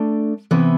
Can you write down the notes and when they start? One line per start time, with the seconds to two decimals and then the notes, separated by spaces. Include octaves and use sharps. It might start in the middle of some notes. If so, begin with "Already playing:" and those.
Already playing: A3 D4
0.51 C3 E3 B3 E4